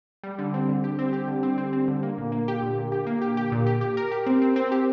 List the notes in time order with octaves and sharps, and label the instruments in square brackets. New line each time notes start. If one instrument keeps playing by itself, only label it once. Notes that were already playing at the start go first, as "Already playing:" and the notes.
[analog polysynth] G3
D3
C4
D3
G4
C4
G4
D3
C4
C4
C4
D3
A#3
A#2
A#3
G4
A#2
A#2
G4
A#3
G4
G4
A#2
G4
G4
A#4
G4
C4
C4
C4
G4